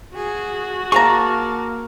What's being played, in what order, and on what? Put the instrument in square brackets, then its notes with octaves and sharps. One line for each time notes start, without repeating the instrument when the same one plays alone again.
[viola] F#4 [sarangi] G#4
[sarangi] A#3 [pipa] G#4 F5 A#5 [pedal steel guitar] A5 C#6